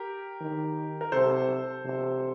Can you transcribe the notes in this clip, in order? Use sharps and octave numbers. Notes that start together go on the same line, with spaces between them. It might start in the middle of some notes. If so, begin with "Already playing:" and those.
Already playing: G4 A#4
D#3
A#4
C3 A4 C5
C3